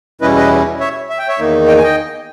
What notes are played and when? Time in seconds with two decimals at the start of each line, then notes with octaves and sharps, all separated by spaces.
0.21 E2 B2 G3 C#4 E4 B4 D#5
0.36 B4 D#5
0.80 C#5 E5
1.09 E5
1.19 G5
1.28 C#5 E5
1.38 E2 D#3 A#3 D#4
1.68 D#5 G5
1.78 G#5
1.83 D#5 G5